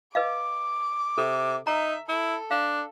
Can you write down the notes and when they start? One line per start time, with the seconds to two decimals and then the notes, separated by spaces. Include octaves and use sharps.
0.15 B4 D#5 F5 D6
1.18 C3 A4
1.67 D#4 E5 A#5
2.09 E4 A4
2.51 D4 F5